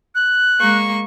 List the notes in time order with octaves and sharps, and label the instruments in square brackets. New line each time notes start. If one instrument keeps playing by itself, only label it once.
[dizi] F#6
[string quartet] G#3 A#3 C#6